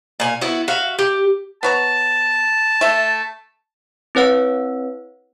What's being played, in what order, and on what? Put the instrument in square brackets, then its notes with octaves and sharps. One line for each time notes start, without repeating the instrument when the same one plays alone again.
[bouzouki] A#2 G#5
B3 E4 F#4
F#4 E5 F5
G4
[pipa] B3 C#5 A#5 [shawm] A5
[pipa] A3 E5
[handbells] C4 E4 B4 C#5 F#5 E6